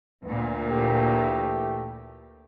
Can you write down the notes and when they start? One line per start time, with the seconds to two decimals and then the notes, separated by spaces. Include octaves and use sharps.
0.24 D2 A#2 B3
0.70 E3 A3 G4